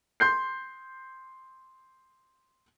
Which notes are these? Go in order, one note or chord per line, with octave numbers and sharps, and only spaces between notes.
C6 G6 C7